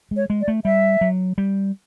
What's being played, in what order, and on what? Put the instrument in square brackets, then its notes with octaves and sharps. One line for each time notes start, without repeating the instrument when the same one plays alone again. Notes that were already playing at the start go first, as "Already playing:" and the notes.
[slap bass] G#3
[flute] C#5
[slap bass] G#3
[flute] D5
[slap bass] A3
[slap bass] G3 [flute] E5
[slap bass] F#3
G3